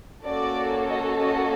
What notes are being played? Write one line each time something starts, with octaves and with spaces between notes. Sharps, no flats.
A#3 C#4 F#4 A4 D5
D#5
D#5